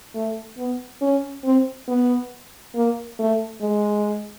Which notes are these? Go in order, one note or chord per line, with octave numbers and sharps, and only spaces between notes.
A3
B3
C#4
C4
B3
A#3
A3
G#3